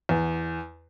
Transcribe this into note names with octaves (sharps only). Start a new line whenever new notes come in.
E2